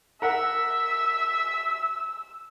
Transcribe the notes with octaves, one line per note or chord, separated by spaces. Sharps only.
A#4 E5 F#5 E6